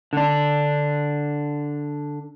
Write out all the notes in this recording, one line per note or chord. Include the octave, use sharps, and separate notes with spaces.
D3 D4